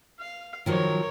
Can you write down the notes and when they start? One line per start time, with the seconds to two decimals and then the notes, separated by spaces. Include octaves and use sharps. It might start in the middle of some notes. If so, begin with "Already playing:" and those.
0.20 F5
0.66 D#3 F3 F#3 A#4 C#5